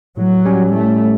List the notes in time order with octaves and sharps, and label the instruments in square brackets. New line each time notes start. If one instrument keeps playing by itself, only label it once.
[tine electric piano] A2 [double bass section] F#3
[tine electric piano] G3 C#4 G4 C#5
[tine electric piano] A2 [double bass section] A3